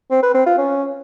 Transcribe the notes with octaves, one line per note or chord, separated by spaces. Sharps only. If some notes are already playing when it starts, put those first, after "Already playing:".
C4
B4
C4
F4
C#4